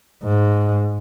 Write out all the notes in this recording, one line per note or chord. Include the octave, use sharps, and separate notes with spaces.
G#2